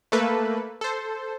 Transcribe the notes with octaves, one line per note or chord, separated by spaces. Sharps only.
A3 A#3 A4 B4
A4 C5